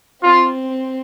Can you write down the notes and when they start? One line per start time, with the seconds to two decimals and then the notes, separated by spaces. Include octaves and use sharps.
0.23 C4 F4